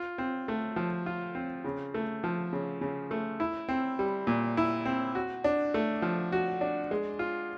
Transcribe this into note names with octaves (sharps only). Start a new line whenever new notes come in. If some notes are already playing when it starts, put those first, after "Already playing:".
Already playing: F4
C4
A3
F3
F4
C4
C#3
A3
F3
C#3
C#3
A3
E4
C4
G3
A#2
E4
C4
F#4
D4
A3
F3
F#4
D4
G#3
F4